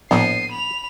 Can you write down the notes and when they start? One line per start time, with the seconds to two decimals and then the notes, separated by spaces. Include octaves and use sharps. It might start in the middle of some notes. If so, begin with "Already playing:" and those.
0.11 A#1 A2 F3 B3 C7 D#7
0.52 B5 F7